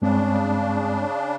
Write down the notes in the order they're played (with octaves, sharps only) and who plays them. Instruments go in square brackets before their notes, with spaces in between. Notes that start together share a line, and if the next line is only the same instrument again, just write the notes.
[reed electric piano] G2 G#3 C4 [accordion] C#3 D4